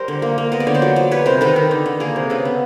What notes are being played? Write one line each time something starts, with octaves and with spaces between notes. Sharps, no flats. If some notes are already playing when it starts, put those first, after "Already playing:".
Already playing: G3 A#4 C5
D3
A#3
A#3
B3 D#5
D5
D3 C#5
C5 D5
F#3
F#3
G3 B4 C#5
C3 A#4 C5
D#3 A4 B4
D#3
D3
D3
A#3 G#4 A#4
C3
C#3 A4 B4
B3